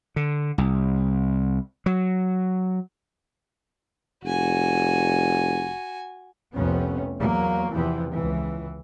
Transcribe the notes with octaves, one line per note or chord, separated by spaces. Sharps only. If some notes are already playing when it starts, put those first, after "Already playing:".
D3
C2
F#3
F1 F#4 G#5
F1 C2 F2 C3 B3 C#4
E2 F#3 A#3
E2 C3 E3 F3 B3
C#2 E3